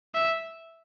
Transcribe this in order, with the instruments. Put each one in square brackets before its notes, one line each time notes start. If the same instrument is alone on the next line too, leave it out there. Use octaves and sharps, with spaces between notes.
[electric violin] E5